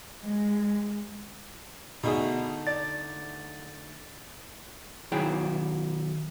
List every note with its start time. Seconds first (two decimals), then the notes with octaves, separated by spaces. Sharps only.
0.22 G#3
2.03 B2 D3 A3 D#4 G#4
2.67 D5 A6
5.12 B1 D#3 F#3 E4 G#4 G5